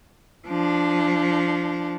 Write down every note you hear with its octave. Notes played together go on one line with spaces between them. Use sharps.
F3 D4